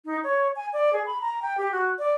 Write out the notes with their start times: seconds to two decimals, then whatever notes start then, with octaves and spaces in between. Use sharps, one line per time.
0.05 D#4
0.24 C#5
0.56 G#5
0.73 D5
0.93 G#4
1.06 B5
1.21 A#5
1.42 G5
1.58 G4
1.72 F#4
1.99 D5